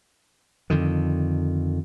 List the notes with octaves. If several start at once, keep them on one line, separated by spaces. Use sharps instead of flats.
F2 D3 D#3